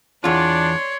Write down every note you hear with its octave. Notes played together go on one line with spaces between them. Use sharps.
E2 D4 F4 C#5 D5 C6